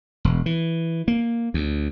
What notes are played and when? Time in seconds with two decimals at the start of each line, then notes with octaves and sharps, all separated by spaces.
0.25 E1
0.46 E3
1.08 A#3
1.54 D2